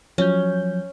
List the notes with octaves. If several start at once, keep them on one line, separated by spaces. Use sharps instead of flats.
F3 F#3 C#4 G6